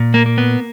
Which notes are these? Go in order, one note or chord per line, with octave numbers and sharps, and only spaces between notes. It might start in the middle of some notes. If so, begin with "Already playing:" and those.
Already playing: A#2
A#3
A#3
B3